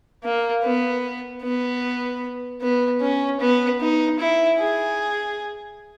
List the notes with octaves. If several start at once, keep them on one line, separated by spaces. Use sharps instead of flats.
A#3
B3
B3
B3
C#4
B3
D#4
E4
G#4